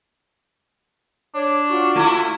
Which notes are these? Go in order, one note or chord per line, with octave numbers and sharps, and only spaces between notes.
D4 C#5
F4 F#4 C#6
A3 E4